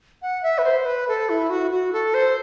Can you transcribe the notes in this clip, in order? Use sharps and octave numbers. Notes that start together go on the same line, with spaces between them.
F#5
E5
B4
C5
B4
A4
E4
F#4
F#4
A4
C5